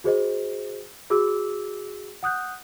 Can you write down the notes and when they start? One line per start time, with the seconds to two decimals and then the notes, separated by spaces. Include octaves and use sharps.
0.04 F#4 G#4 C5 D#5
1.10 F#4 G#4 D6 E6
2.23 F#5 D#6 F#6 G6